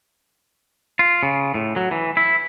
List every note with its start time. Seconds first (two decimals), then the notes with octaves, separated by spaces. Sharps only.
0.99 F4
1.23 C#3
1.54 A2
1.76 F#3
1.91 E3
2.17 E4